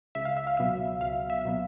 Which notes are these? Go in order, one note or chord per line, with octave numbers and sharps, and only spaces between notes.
C#2 E5
F5
E5
F5
B2 F#3 B3 E5
C#2 F5
E5
B2 F#3 B3